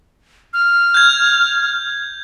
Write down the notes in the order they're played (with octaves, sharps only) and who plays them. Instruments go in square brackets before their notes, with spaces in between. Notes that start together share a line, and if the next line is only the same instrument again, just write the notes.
[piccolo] F6
[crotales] G6 G#6